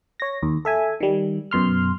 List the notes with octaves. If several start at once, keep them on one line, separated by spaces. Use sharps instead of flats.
C#5 A#6
D#2
A4 E5 G#5
D#3 G3
F#2 B2 C6 F6